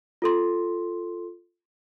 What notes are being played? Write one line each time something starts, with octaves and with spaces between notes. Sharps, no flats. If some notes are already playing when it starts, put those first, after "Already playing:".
F4 A4 C6